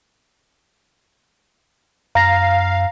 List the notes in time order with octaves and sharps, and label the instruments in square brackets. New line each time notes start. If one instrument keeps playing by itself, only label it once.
[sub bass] F#2 [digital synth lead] F5 [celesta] A#5 A#6